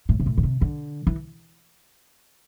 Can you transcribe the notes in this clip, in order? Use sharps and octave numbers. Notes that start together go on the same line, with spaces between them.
A2
C3
A2
D3
C3
D3
E3